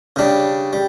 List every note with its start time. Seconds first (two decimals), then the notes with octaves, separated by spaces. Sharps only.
0.16 C#3 G3 D4
0.73 G3